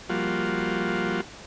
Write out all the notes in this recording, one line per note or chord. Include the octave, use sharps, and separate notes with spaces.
F3 G3 A#3 F4 F#4